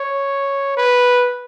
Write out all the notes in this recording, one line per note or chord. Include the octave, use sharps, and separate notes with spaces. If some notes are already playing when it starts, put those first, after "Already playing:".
Already playing: C#5
B4